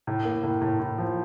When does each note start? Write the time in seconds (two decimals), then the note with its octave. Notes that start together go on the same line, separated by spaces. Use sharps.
0.07 A2
0.25 A#3
0.44 A2
0.61 A2
0.80 A2
0.98 F3